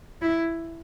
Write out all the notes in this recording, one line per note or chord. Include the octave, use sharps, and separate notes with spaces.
E4